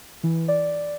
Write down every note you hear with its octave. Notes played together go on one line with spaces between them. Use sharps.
E3
D5